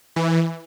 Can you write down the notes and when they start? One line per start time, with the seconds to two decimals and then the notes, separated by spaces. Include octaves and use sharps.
0.16 E3